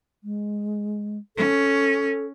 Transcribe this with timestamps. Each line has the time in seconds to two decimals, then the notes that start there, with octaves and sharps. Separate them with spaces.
0.24 G#3
1.37 C#4 A4